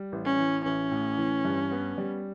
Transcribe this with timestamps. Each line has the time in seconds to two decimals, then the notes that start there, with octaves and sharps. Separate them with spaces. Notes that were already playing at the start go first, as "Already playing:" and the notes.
Already playing: G3
0.12 A1
0.25 C#4
0.38 E3
0.64 A1 C#4
0.91 A2
1.18 E3
1.45 G2
1.71 B3
1.98 G3